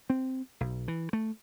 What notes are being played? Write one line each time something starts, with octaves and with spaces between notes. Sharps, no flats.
C4
B1
E3
A3